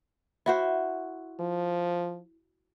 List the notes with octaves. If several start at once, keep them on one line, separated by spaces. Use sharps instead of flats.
E4 F#4 C5
F3